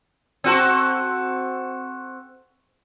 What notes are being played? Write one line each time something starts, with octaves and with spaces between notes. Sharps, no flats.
C4 F#4 A4